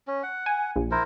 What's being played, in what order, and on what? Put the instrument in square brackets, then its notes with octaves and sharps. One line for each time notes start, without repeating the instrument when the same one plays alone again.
[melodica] C#4
F#5
[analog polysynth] G#5
A#1
[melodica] E4 A#4 C5